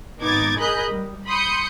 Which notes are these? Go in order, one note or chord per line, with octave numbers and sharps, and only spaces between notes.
G#1 B3 D#4 D6 G#6 A6
G#4 A#4 D#5 B5 F#6 G6
G3
B5 C6 D#6 G6 C#7